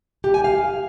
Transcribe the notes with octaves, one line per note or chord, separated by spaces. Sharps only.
G4
G#5
F5